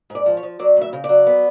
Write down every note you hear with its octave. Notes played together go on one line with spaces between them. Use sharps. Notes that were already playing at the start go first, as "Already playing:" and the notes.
G#2
D5
F3
C#5
F3
F#3 D5
D2 E5
C#3
D5
F#3
B3